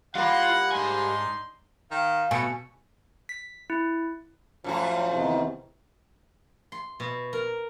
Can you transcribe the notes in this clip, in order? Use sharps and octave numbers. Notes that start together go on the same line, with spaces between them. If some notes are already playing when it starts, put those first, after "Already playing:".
G3 A#3 F4 F5 F#5
G#2 D4 D#4 G#5 C6
D#3 F5
B2 A3 G#5 C#7
B6
E4
F#2 A2 F3 F#4
E2 C3 D#3
C6
B2
A#4